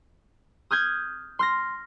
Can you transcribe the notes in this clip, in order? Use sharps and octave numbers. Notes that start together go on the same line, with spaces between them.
D#6 F6 G6 G#6
C6 F6 A#6